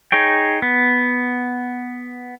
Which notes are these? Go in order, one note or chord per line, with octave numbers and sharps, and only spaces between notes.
D#4 G#4 C#5 G5
B3